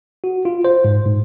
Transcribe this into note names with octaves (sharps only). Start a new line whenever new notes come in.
F#4
F4
C5
G#2
G#2